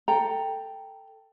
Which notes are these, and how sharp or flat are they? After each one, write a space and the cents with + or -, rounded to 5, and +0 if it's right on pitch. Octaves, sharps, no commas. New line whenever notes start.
A4 +15 G5 +0 A#5 +0